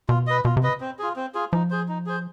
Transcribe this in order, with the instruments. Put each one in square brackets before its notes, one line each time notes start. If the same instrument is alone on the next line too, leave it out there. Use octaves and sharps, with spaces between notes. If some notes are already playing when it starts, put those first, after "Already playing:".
[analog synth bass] B2 [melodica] F4
[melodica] B4 D#5
[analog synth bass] B2 [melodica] F4
[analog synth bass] C3
[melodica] B4 D#5
C4
F4 G#4
C4
F4 G#4
[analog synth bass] F3 [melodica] D#4
[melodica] G#4 C5
D#4
G#4 C5